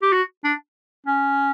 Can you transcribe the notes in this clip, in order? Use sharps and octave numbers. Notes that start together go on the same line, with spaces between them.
G4
F#4
D4
C#4